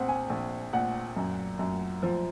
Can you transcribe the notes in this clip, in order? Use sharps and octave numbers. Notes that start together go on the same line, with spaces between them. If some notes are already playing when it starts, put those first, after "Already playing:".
Already playing: A#1 C4 F#5
G#5
A#1
A#2 F#5
F#2
F#2
F3